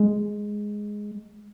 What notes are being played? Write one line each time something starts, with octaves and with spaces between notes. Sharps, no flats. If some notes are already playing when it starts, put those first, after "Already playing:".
Already playing: G#3